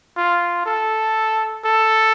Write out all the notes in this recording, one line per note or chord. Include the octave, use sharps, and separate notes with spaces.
F4
A4
A4